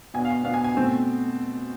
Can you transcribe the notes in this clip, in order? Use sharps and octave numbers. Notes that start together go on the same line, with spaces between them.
B2 B3 D4 G#5
F5
B2 B3 D4 F5
G#5
G#5
B2 A3 C4